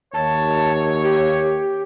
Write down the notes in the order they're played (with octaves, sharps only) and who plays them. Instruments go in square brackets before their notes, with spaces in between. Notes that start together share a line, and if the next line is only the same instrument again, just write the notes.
[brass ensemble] D#2 C#5 [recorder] A5
[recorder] G4